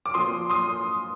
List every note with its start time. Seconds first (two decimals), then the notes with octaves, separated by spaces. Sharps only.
0.06 D6
0.14 A#2 F3 C6 D#6
0.50 C6 D#6